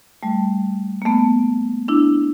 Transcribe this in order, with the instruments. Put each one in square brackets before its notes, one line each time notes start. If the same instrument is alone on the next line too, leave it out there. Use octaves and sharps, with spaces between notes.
[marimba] G3 A3
A#3
A3 B3
D4 E4